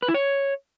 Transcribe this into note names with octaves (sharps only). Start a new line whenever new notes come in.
B4
E4
C#5